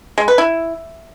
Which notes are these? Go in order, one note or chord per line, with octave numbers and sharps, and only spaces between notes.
G#3
B4
E4